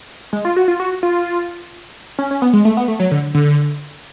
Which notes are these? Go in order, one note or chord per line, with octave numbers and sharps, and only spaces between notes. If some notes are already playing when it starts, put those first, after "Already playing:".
G#3
F4
F#4
F4
F#4
F4
C#4
C#4
B3
G#3
A3
B3
A3
F#3
D3
D3